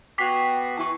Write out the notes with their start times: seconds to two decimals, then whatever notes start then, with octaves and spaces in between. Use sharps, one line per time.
0.18 B3 F#4 G4 D6 B6 C7
0.77 E3 A5 C#6